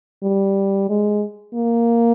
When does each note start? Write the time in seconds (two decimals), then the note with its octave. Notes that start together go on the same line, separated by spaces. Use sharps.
0.23 G3
0.89 G#3
1.54 A#3